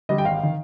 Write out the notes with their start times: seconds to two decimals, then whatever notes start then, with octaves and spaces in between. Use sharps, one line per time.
0.09 D3 G3 D#5
0.18 G5
0.25 G#1 F5
0.43 D#3